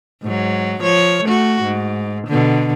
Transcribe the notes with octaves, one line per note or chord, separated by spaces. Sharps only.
G#2 F#3
F3 C#5
A3 F#4
G#2
B2 D3